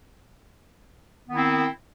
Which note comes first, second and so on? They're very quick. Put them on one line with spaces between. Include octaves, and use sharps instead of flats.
B3 D#3 E4 C4